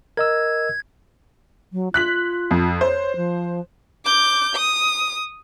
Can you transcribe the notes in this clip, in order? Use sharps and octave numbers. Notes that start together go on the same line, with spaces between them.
A#4 D#5 E6 G#6
F#3
F4 F#6 B6 F#7
F2
C5 C#5
F3
D6 G6
D#6